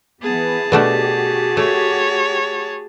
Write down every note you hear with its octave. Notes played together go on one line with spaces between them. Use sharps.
E3 B3 G#4 A5
B2 A3 D4 F#4 G4
A3 C#5